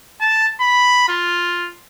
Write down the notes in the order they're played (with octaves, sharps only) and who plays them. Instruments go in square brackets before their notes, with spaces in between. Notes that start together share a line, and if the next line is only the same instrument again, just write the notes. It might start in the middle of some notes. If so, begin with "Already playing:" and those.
[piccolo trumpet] A5
B5
F4